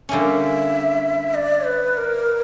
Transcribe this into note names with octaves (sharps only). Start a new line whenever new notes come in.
D3 G3 A#3 C#4 E5
D5
B4
A#4